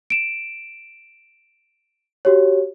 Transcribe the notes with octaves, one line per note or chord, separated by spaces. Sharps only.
D7 E7
F#4 G4 C#5